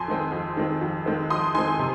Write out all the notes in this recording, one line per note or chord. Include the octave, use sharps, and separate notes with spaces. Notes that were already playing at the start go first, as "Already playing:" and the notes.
Already playing: F2 G#5 C6
D#3 G#3 C4
F2
D#3 G#3 C4
F2
D#3 G#3 C4
F2 C6 D#6
D#3 G#3 C4 G#5 C6
C3